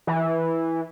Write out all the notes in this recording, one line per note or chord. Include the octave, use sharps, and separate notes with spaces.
E3